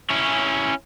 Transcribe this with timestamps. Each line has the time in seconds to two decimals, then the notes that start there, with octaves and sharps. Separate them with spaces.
0.10 C#4 E4